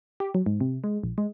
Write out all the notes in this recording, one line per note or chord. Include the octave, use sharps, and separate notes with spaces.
G4
F#3
G#2
C3
G#3
A#1
G#3